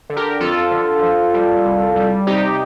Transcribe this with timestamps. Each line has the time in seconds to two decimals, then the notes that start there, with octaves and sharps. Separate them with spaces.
0.10 D3
0.17 G4 A#4
0.40 F2 F4 A4
0.71 D3
1.03 F3
1.34 G3
1.65 C2
1.96 G3
2.27 C3 D#4 G4